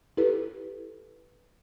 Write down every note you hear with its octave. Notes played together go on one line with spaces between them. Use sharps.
E4 G4 A4 B4